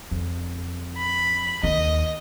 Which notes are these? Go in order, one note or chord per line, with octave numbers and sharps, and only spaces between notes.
F2
B5
D#2 D#5